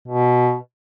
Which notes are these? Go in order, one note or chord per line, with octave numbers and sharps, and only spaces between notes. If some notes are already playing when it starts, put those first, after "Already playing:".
B2